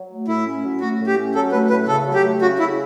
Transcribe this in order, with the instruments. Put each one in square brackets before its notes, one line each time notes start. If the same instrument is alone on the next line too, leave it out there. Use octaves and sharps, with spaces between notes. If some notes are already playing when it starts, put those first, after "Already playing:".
Already playing: [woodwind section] F#3
A3
[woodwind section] A2 [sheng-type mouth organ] E4
[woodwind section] C#4
F#3
[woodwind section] A3 [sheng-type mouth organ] F#4
[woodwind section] A2
[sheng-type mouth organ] G4
[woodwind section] C#4
[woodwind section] F#3 [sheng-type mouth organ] A4
[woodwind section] A3 [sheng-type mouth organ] B4
[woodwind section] A2 [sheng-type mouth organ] B4
[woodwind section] C#3 [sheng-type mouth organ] A4
[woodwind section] F#3
[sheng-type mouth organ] G4
[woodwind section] A3
[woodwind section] C#3 [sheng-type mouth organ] F#4
[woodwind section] C#3 [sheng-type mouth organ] E4